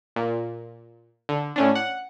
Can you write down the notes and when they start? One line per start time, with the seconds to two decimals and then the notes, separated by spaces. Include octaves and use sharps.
0.16 A#2
1.29 D3
1.56 A2 C#4 D4
1.75 F#5